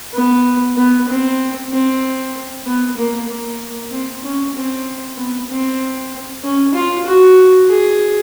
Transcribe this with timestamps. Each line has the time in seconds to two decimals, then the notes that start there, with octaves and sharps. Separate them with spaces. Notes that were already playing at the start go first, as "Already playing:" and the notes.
0.14 B3
0.78 B3
1.08 C4
1.72 C4
2.67 B3
2.97 A#3
3.29 A#3
3.92 C4
4.24 C#4
4.55 C4
5.17 B3
5.50 C4
6.44 C#4
6.75 F4
7.06 F#4
7.70 G#4